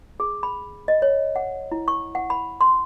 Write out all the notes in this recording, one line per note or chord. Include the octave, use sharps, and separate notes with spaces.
G#4
B5
D#5
C#5
F#5
E4
C#6
F#5
B5
C6